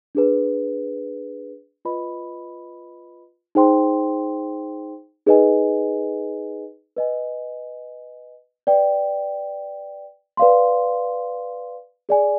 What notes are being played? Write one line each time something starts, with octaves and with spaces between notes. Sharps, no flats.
D4 G#4 B4
F4 B4 D#5 B5
D#4 G#4 C5 G5 C6
D#4 G#4 B4 D#5 G#5
B4 D#5 G#5
B4 D5 G5
B4 D5 F5 C6
G#4 D5 G#5